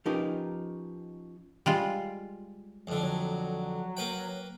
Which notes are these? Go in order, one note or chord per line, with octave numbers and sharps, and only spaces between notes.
F3 C#4 D#4 G4 A#4 B4
G3 G#3 F4
F2 D3
F#3
A#3 B4 G5